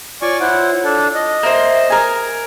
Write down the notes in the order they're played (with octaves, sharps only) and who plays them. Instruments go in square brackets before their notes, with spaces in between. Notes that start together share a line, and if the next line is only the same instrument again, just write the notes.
[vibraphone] F4 C#5 [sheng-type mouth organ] D5 G#5 C#6
[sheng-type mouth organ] E4 C5 F#5
D4 A4
D#5
[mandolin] A#3 C5 [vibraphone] E5
[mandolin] A#4 G#5 [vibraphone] C5